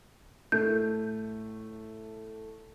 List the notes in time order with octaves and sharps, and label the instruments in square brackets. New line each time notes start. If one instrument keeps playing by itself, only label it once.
[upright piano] A2 A3 [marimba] G6